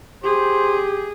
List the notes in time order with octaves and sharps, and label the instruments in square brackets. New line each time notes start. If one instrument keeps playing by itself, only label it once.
[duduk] G4 [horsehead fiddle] G#4 [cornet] C5